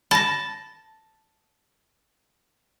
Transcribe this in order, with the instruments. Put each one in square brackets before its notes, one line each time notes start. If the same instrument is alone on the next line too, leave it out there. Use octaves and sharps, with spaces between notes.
[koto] A5 [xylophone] B5 A#6